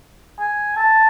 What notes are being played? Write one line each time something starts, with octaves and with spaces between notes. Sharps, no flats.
G#5
A5